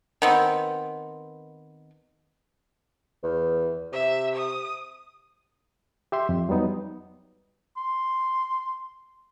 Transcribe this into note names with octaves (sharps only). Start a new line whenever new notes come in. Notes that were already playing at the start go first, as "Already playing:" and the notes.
D#3 B3 C4
E2
C3 E5
D#6
G4 E5 C6
F2
F#3 G3 B3 D#4
C6